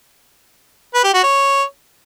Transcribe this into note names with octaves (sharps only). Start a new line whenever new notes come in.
B4
G4
F#4
C#5